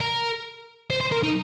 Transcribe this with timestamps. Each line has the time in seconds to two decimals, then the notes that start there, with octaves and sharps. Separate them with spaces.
0.01 A#4
0.90 C5
1.01 C5
1.12 A#4
1.23 D#4